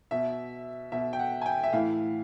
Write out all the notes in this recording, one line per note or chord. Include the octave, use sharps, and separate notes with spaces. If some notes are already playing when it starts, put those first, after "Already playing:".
B2 E5
B2 E5
G5
F#5
G#5
G5
E5
A2 E3 F5